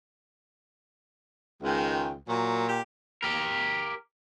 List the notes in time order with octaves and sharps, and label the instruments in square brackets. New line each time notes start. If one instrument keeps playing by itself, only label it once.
[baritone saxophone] C#2 [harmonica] D#3 G#3 G5
[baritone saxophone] A#2 [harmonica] F#3
[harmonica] G4
[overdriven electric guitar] G4 A#4